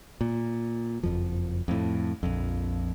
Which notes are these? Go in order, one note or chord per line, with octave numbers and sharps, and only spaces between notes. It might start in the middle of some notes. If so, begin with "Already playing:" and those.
A#2
F#1 F2 F3
F2 A2
A#1 F2